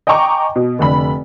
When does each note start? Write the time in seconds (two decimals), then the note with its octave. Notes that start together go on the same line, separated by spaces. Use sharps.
0.07 D#5 G5 G#5 A#5 C#6 D6
0.56 B2
0.79 F1 D3 B5